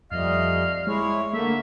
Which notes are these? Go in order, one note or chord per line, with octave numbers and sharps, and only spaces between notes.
F2 G3 A3 D#5 F5
G#3 E4 C#5
D3 A3 A#3 E5